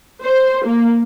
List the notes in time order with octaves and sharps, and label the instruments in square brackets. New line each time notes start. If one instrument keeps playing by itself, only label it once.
[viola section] C5
A#3